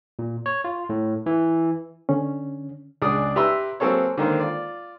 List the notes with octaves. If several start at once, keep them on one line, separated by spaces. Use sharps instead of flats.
A#2
C#5
F4
A2
E3
D3 C#4
C#2 D4 G#4 D5 D#6
G4 B4 E5 A#5 C6 E6
F#3 A#3 C4 G#4 A4 C#5
D3 D#3 A#3 C5
F4 D5